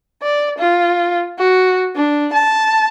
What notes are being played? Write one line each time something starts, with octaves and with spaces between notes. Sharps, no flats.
D5
F4
F#4
D4
A5